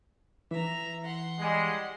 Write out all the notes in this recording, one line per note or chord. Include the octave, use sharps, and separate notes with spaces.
E3 E5 A#5
F#5 C6
G3 G#3